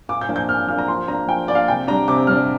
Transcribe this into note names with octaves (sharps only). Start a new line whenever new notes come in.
A#2 D6
G6
F3 A#3 D4
G6
A#2 F6
F3 A#3 D4 F6
A#5
F3 C6
A#3 D4 A#5
F3 G5
A#3 D4 D5 F5
C3 G5
G3 D4 A#5
C3 D6
G3 D4 F6